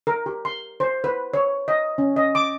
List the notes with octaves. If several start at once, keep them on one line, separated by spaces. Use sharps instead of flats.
A#4
G4
C6
C5
B4
C#5
D#5
C#4
D#5
D6